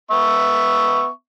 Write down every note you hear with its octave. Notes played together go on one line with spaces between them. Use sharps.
B3 E5 C#6